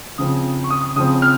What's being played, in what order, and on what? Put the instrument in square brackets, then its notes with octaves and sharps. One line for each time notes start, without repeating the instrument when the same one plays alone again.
[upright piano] C#3 F3 C4 D#6
C#6
D#6
C#3 F3 C4 D#6
F6